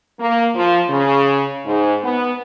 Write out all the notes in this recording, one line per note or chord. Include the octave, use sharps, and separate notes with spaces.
A#3
F3
C#3
G#2
B3